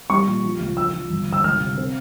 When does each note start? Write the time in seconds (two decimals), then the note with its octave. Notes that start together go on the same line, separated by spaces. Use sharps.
0.10 G3 C#6
0.27 A#2
0.44 F3
0.60 C#2
0.77 F3 E6
0.94 F3
1.10 G1
1.27 G1
1.33 E6
1.44 C#2 F6
1.60 C3
1.78 C4